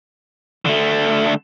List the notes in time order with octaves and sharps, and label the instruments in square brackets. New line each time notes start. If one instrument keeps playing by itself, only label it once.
[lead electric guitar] D3 A3